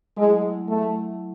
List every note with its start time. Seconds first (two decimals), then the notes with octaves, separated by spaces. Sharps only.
0.17 F#3 G#3 A3 E4
0.69 A3